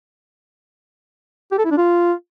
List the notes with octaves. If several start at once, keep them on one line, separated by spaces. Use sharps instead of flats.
G4
A4
E4
D4
F4